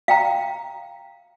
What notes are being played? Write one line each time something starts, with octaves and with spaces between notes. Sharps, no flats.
F5 G5 A#5